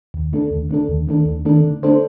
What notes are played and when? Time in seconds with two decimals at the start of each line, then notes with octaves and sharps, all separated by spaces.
0.14 D#2
0.32 D3 A3 D4 A4
0.51 D#2
0.69 D3 A3 D4 A4
0.89 D#2
1.07 D#3 A3 D4 A4
1.26 D#2
1.45 D#3 A3 D4 A4
1.64 D3
1.83 A3 D4 A4 C5